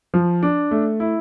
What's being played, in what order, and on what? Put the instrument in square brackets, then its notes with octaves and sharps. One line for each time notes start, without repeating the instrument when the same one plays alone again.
[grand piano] F3
D4
A3
E4